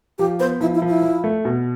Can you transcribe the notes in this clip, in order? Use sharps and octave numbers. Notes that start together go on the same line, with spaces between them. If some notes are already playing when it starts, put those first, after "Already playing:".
F3 G4
B3 C5
F3 E4
E4
F3
E4
F3
A3
B2